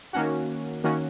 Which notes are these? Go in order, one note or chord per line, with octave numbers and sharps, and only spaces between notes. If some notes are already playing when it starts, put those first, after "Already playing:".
D#3 A#3 C#4 F#4
D#3 A#3 C#4 F#4